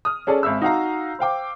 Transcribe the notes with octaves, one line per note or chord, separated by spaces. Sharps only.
D#6 F6
C#4 G#4 A4 D5
G#1 E5 E6
D#4 F#4 F5 A#5
C5 F5 G5 D6